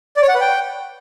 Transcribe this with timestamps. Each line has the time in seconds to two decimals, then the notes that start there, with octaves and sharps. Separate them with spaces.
0.17 D5
0.23 C#5
0.29 F#5
0.35 B4
0.41 G5